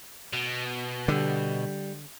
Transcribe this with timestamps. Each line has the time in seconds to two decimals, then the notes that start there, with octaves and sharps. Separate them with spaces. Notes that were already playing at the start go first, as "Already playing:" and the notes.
0.33 B2
1.08 D3 G3